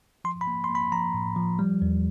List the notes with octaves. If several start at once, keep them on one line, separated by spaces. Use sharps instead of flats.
F3 C6
B5
A#3
C6
A#3
B5
F3 A#5
A2
F3
G3
E2